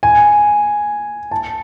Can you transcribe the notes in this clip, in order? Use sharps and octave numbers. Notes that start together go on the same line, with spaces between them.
G#5
A5